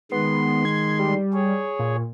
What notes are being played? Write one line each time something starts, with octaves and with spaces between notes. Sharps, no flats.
D#3 G#3 B3 C6
G#6
G3
G#4 C#5
A#2